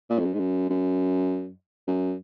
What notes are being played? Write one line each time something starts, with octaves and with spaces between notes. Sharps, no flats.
A#2
F2
F#2
G#2
F#2
F#2
F#2